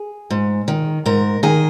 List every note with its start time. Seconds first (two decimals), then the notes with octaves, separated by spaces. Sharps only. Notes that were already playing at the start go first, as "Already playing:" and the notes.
Already playing: G#4
0.30 G#2
0.68 D#3
1.06 G#2 A#4
1.43 D#3 G#4